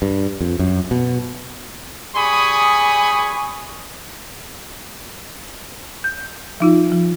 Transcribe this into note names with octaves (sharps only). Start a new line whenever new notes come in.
G2
F2
F#2
B2
G3 G#4 G#5 B5 C#6 D#6
G6
F3 D#4 F4
F3